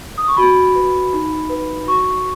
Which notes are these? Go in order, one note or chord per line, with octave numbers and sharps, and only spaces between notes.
D#6
C#6
F#4 B5
B4
D#4
B4
F#4 C#6